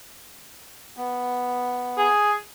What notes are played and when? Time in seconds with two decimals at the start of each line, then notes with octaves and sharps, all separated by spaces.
0.97 B3
1.97 G#4